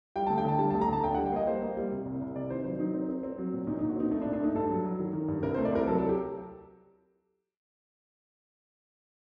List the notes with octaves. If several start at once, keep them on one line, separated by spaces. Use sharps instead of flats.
G3 G5
A5
D2
G5
D3 A5
G3 A5
A5
D2
A#5
D2 A5
D3 G5
F#5
G3
G5
A#3 D#5
G3 C5
A#3
G3
C3
C2
C2
C3 D5
D#3 C5
F#3 C5
F#3 D#4
C4
C4
C4
F#3
A#2
A#2 D#4
D#4
A#2
F#4
C4 D#4
A3 D#4
D4
A#2
D4
A3 D#4
G2 A4
F#3
F#3
D#3
D#3
G2
C2 A#4
C5
A3
D5
C2 A#4
F#3 A4
A4
G4